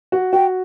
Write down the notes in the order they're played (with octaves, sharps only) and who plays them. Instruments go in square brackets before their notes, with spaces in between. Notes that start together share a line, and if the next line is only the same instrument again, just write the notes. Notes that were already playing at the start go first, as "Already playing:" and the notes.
[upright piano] F#4
[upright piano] F#4 [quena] G5